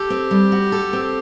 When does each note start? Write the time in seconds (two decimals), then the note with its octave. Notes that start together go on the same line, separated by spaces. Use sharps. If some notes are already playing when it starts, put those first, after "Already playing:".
Already playing: G4 A4
0.10 C4
0.31 G3
0.52 F#4
0.72 A4
0.93 C4